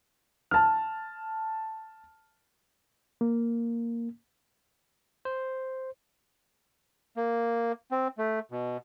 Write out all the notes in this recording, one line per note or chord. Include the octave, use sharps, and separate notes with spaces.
A5 F6
A#3
C5
A#3
C4
A3
B2